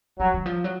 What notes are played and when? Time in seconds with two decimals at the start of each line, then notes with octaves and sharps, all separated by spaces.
0.19 F3 F#3
0.34 D#3
0.46 F3
0.64 F#3